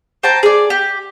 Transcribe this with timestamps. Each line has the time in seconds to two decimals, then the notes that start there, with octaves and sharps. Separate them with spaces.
0.23 C5 G5 A5 A#5
0.43 G#4 D5
0.70 G4